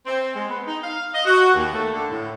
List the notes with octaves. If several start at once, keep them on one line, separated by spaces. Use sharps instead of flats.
C4
G#3
B3
D#4
F5
D#5
F#4
D#2
A3
D3
A2